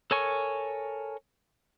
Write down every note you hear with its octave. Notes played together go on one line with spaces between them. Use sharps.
A4 A#4 C#5 G#5 C#6